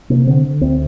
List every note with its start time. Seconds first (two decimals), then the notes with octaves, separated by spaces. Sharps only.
0.10 C3 A#3
0.27 D3 C4
0.44 D3
0.61 D2 C4